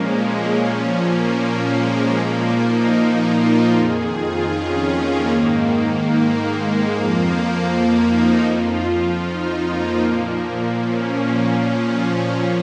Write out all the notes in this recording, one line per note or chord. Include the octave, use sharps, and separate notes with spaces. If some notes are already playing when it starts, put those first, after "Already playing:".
Already playing: A#2 F3 G#3 A#3 C#4
G#3
A#2 F3 C#4
A#3
G#3
A#2 F3 A#3
D#4
D#4
F4
F2 D#3 G#4
F4
C#4
A#3
G#2 D#3
A#3
G#3
F2 F3 A#3
A#3
A#3
D#4
F2 F3 F4
F4
D#4
A#3
A#2 F3
C#4
A#2 F3